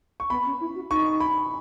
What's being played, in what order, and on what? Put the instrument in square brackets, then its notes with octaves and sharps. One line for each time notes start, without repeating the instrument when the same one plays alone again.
[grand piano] C#6
[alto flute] B3 [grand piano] B5
[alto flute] C#4
E4
F#4
[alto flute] D#4 [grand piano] C#6
[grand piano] B5